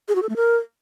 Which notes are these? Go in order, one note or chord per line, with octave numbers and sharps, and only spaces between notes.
G#4
F#4
A4
A3
A#4